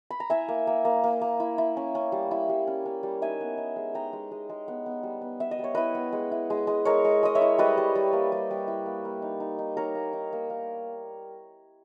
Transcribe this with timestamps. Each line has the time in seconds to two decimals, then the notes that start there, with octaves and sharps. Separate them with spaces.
0.10 B5
0.20 A#5
0.30 E4 E5 G#5
0.48 A#3
0.67 A#3
0.85 A#3
1.04 A#3
1.21 A#3
1.40 E4
1.58 E4
1.77 C#4
1.95 C#4
2.12 G3
2.31 E4
2.49 G3
2.67 C#4
2.86 C#4
3.03 G3
3.22 D#4 E5 G#5
3.41 B3
3.58 D#4
3.76 G#3
3.94 D#4 G5 A#5
4.13 G#3
4.31 G#3
4.49 G#3
4.68 B3
4.86 B3
5.03 G3
5.22 B3
5.40 B3 E5
5.51 D#5
5.59 G3
5.64 C#5
5.75 E4 B4 D#5
5.95 B3
6.13 G#3
6.31 E4
6.50 G#3
6.67 G#3
6.85 G#3 A#4 C#5
7.04 G#3
7.23 G#3 D#5
7.35 C#5 E5
7.41 E4
7.58 G3 B4 D#5
7.78 G3
7.95 G3
8.13 A#3
8.32 G3
8.50 G3
8.67 E4
8.86 A#3
9.05 A#3
9.22 D#4
9.40 D#4
9.59 D#4
9.77 D#4 A#4 C#5
9.95 A#3
10.13 D#4
10.33 A#3
10.50 A#3